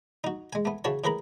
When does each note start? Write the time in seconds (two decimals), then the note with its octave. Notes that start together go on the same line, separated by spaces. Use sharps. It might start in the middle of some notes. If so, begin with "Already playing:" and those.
0.24 D#4 F#4
0.53 G#3 G#5
0.65 A3 B3
0.84 C#3 E3 F#4 C#5 A5
1.04 A2 G#4 A#4 B4 A#5 B5